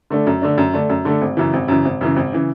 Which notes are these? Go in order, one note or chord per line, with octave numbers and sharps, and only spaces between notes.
D3 A3 D4
F#2
D3 A3 D4
F#2
D3 A3 D4
F#2
D3 A3 D4
G#1
F#2 C#3 E3
G#1
F#2 C#3 E3
G#1
F#2 C#3 E3
G#1
C#3 E3